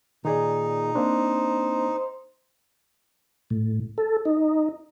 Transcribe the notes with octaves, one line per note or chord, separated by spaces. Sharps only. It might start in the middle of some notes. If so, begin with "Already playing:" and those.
A#2 D#3 D#4 G#4 D5
A#3 C4 D4 C5
A2
A4
D#4